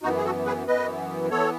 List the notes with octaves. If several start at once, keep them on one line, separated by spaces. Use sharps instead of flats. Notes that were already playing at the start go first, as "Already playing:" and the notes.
F#2 E3 B3 D#4 F#4
G#4
F#4 A4
G#4 B4
F#2 E3 B3 B4 D#5
E3 B3 A4 C#5